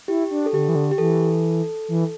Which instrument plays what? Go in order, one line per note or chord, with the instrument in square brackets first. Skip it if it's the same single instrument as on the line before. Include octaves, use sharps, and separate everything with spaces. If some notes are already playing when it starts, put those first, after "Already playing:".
[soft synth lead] E4 [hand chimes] G4
[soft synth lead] D4
[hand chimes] A4
[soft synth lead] D3 [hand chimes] G4
[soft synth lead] E3
D3
[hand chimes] G4
[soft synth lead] E3 [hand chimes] A4
[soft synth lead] E3